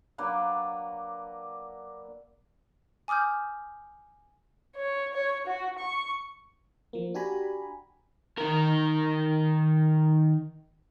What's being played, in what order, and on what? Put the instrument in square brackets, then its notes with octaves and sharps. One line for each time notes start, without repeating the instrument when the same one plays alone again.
[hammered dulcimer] F#3 A#3 D4 B4
[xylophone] G#5 D6 D#6 F6 G6
[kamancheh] C#5
C#5
F#4
C#6
[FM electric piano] F3 A#3
D4 F#4 G4 G#5 A#5 B5
[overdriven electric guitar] D#3 A#4